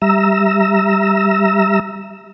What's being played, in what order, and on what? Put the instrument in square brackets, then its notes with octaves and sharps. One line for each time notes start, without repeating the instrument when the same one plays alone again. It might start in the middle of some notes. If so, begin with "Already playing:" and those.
[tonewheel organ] G3 E5 A#5 E6